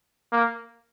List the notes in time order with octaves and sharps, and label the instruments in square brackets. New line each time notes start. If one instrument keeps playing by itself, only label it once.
[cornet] A#3